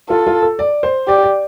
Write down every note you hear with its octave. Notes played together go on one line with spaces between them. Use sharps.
F4 A4
F4
A4
D5
C5
G4 D5
D5